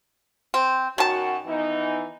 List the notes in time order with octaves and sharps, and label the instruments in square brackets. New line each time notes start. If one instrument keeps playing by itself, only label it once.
[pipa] C4
[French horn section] F#2 F#4 [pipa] D#3 A5
[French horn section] E3 B3 D#4